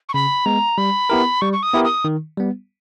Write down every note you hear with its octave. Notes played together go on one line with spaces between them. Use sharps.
C#6
C#3 B5
G#3 B3 A#5
G3 B5
B3 E4 G4 A#4
G3 C#6
C#6
D#6
B3 E4 G4 A#4
D#6
D#3
G3 B3